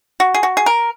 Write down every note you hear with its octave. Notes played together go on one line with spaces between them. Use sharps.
F#4
G#4
F#4
G#4
A#4